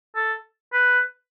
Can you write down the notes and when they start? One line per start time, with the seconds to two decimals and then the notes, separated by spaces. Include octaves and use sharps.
0.16 A4
0.73 B4